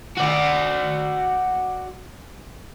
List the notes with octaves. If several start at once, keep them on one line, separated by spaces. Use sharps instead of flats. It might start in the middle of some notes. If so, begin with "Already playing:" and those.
F#4 D5